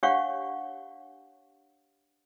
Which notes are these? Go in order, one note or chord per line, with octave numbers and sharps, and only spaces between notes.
D4 G4 C#5 F5 F#5 C#6